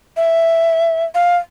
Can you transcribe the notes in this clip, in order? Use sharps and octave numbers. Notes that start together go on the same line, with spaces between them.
E5
F5